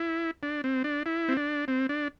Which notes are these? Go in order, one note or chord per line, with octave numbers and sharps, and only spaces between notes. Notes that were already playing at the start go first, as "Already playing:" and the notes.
Already playing: E4
D4
C4
D4
E4
C4
D4
C4
D4